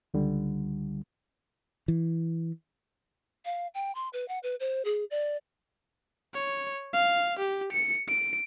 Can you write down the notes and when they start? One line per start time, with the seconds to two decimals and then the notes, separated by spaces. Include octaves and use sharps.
0.14 C#2 D3 G3
1.88 E3
3.45 F5
3.74 G5
3.95 C6
4.13 B4
4.28 F#5
4.43 B4
4.60 C5
4.85 G#4
5.11 D5
6.34 C#5
6.93 F5
7.39 G4
7.72 C#7
8.08 D7